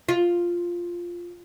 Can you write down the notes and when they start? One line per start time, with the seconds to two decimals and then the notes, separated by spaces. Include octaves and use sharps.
0.09 F4